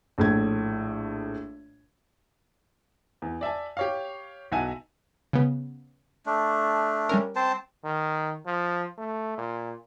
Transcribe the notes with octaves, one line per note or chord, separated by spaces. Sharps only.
A#1 A2 G#6
E2
D5 E5 G#5 A5
G4 C#5 F5
B1 E5 F#5 G#5 A5 D#7
C#3 B3
A3 D4
G3 C#4 A#4
C4 C5 A5
D#3
F3
A3
A#2